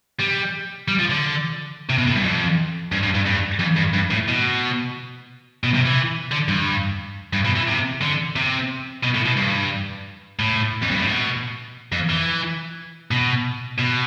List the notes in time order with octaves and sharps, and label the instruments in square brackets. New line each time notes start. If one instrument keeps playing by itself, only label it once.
[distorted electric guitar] G3
G3
F3
D3
C3
B2
A2
G2
F2
G2
G2
G2
G2
F2
G2
G2
A2
B2
B2
C3
E3
D3
G2
G2
B2
E3
C3
D3
C3
B2
A2
B2
G2
A2
F2
G2
A2
B2
F2
E3
B2
B2